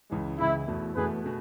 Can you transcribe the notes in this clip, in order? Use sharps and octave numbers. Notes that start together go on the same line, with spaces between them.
C#2 C#3 E3 G#3
C#2 C#3 E3 G#3 E4
E2 B2 A3
E2 B2 A3 G#4 B4
B2 A3